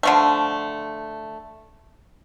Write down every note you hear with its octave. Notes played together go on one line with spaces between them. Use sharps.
D3 F3 A3